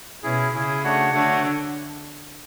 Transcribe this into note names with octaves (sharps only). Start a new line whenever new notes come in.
B2 C#4 E4 G#4
C#3 C#4 E4 G#4
A3 D4 F#4 C#5 F#5
D3 A3 D4 F#4 C#5 F#5